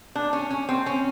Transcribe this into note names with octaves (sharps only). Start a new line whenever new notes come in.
D4
C#4
C#4
C4
C#4